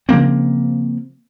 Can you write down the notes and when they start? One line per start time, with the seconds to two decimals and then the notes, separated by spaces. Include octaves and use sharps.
0.09 C#3 F3 A#3 C4